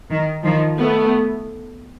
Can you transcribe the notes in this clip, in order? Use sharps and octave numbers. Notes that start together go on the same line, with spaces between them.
D#3
D#3 F3
A3 B3